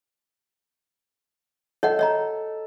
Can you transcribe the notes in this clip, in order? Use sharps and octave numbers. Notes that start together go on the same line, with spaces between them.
A4 C#5 D#5 F#5
C#5 D#5 A#5